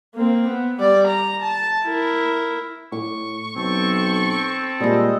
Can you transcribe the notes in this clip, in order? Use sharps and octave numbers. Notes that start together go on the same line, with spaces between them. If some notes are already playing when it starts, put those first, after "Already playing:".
A#3 C4
B3
G3 D5
A#5
A5
E4 A#4
A2 C#6 D6
B1 C4 A4 C#6
A#2 G3 G#3 D#5